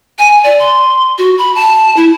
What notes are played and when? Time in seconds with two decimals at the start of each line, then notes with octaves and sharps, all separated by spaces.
0.19 G#5
0.44 D5
0.59 C6
1.18 F#4
1.38 B5
1.55 A5
1.97 E4